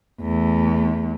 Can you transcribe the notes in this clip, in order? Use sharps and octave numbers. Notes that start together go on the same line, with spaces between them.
E2 A3